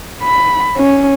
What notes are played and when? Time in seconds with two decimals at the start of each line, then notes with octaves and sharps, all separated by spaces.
0.24 B5
0.78 C#4